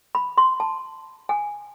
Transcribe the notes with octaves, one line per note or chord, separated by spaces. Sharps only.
B5
C6
A5
G#5